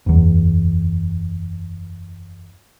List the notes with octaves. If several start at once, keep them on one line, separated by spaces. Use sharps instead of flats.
F#1 E2